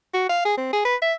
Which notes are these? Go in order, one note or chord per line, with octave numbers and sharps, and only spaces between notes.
F#4
F5
G#4
C4
G#4
B4
E5